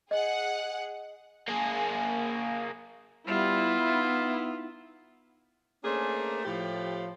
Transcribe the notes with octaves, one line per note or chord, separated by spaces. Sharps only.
G#4 D#5 F#5
A#3 G#4
G3 B3 E4 F4
D#4
A3 A#3 C#4 D4 G#4 C5
A2 F3 G4